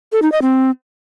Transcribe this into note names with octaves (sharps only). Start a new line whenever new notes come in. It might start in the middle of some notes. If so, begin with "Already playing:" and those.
A4
D#4
D#5
C4